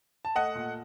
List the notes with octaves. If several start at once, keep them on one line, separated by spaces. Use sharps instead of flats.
A5
A3 D#5 F#5
A#2